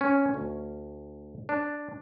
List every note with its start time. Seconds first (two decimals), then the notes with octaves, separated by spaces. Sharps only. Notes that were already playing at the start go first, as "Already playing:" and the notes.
0.01 C#4
0.34 D2
1.49 D4